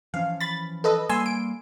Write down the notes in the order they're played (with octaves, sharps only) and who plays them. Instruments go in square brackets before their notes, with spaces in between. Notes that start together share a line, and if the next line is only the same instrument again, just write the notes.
[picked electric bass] E3 F3 C#4 [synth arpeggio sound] F5
[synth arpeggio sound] B5 A6
A4 B4 D#5
[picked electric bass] G3 A#3 [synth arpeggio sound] G#5 C6 E6
[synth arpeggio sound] D7